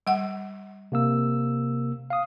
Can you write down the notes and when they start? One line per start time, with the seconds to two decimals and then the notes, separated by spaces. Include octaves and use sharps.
0.07 G3 F#5
0.92 C3 A#3 E6
2.10 F5 D#6